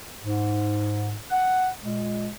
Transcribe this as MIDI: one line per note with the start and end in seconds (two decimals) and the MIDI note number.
0.23 1.16 44
1.30 1.68 78
1.83 2.29 46
1.83 2.29 56